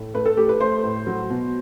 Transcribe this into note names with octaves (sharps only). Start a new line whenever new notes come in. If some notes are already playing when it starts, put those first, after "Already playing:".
Already playing: A2
A3 B4
A4
A3 G4
B4
A3 C5
A2
F#3
B2